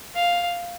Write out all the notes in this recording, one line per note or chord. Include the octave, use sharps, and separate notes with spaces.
F5